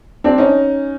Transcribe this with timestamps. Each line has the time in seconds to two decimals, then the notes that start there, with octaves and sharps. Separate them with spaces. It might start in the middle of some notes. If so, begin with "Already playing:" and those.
0.24 C4 D4
0.38 C#4 D#4